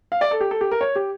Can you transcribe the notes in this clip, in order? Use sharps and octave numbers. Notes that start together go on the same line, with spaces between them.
F5
D5
A4
G4
A4
G4
A#4
C#5
G4